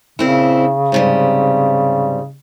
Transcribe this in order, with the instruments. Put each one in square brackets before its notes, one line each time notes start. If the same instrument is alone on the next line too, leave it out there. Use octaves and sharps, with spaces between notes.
[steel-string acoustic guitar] A#2 C4 E4 [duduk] C#3
[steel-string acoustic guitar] G#2 C3 G3